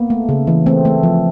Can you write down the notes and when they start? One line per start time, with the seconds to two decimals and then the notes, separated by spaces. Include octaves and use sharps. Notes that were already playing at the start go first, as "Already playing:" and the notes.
Already playing: A#3 B3
0.10 A3
0.29 C#3
0.47 E3
0.66 A3 C4
0.85 A3
1.03 F3